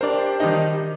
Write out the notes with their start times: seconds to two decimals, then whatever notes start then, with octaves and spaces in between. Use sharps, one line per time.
0.01 D4 G4 A#4 C5 D5
0.40 D#3 G3 D#4